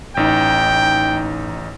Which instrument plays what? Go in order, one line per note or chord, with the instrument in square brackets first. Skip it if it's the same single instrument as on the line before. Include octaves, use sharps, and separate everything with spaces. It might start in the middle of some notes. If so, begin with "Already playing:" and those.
[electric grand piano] A1 D#4 [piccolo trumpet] G5